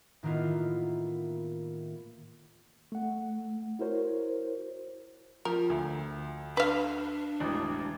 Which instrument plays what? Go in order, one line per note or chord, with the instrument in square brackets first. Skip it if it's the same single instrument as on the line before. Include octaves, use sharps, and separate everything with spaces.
[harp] A2 D#3 A#3 B3 E4 F4
[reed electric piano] A3 F#5
E4 F#4 A#4 C5 C#5
[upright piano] F3 [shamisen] A#4
[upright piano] D2
[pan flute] D4 [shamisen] B4 F5
[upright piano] E1 A1